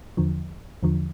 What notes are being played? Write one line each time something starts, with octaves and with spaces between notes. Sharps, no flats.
E2 D3 F3
E2 D3 F3